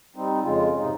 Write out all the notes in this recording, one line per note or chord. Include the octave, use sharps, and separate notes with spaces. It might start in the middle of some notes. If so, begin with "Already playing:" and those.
G3 C4 D#4
F2 C#3 G#3 F4
G#2 C3 D#4